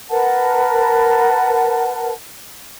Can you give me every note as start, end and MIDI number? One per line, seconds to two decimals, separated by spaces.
0.10 2.11 70
0.10 2.11 71
0.10 2.11 78
0.10 2.11 81